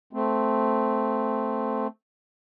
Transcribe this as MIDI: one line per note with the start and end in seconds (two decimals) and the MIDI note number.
0.13 1.87 57
0.13 1.87 60